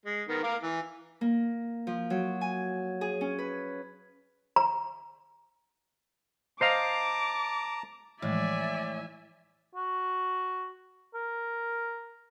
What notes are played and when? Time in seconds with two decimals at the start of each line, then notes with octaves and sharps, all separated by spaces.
0.06 G#3
0.28 D#3 B3 A#4
0.43 A#4 F5 D6
0.63 E3
1.21 A#3
1.87 F3
2.10 F#3
2.41 G#5
3.01 G#4
3.21 C#4
3.38 B4
4.56 A#5
6.61 C5 D#5 F5 A5 A#5 D6
8.22 A2 E3 F3 G#3 D5 E5 G#5
9.75 F#4
11.14 A#4